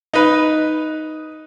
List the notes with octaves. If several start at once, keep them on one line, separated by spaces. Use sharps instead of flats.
D#4 B4